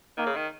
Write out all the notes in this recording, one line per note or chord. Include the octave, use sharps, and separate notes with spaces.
D#3 A#3
C#3
D#3